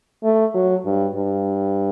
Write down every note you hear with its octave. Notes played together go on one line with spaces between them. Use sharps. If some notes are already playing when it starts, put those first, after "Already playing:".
A3
F#3
G2
G2